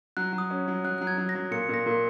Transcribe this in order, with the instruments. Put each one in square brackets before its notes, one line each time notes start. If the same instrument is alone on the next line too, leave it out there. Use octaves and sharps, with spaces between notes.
[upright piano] F#3 [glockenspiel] F#6
[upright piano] F#3
[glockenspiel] D#6
[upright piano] C#4
F#3
[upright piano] F#3 [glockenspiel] F#6
[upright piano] F#3 [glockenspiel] F#6
[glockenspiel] G#6
[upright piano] F#3
[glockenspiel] A#6
[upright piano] F#3
[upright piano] A#2 [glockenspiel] C#7
[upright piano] A#2 [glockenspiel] A#6
[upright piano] A#2